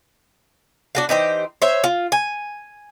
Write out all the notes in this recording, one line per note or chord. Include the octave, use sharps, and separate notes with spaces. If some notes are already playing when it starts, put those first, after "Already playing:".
D4 F#4 F5
E3 D#4 G4 C5
C5 C#5 E5
F4
G#5